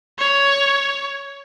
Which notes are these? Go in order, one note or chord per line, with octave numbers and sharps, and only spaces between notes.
C#5